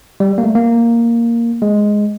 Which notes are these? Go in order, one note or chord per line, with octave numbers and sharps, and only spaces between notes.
G3
A#3
A3
A#3
G#3